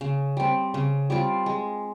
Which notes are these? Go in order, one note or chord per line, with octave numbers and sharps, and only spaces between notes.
C#3
G3 C4
C#3
G3 C4 F4
G#3